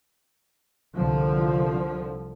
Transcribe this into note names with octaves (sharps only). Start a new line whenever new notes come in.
C2 D3 F3